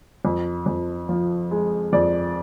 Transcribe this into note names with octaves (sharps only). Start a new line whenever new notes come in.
F2
F2
F3
G#3
F2 D5